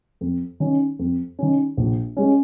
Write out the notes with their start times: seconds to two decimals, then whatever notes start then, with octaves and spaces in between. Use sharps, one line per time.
0.21 F2
0.60 D#3 C#4
0.99 F2
1.39 D#3 C#4
1.77 A#1
2.17 G#3 C#4